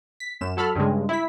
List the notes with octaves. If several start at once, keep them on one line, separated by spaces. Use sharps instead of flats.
B6
F#2 E7
F#3 A4 B5 F6
G2 C#3 G#3
E4 B6